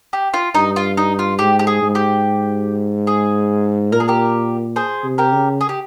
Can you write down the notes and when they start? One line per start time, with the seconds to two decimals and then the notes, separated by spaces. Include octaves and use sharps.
0.13 G4
0.34 F4
0.55 G2 D#4
0.76 F4
0.97 D#4
1.19 F4
1.39 G#2 G4
1.59 G4
1.67 G#4
1.82 G#2
1.95 G4
3.07 G#4
3.92 A#2 A#4
4.00 G#4
4.08 G4 A#4
4.76 G#4 C5
5.04 C3
5.18 G4 A#4
5.32 C#3
5.61 G#4
5.69 G4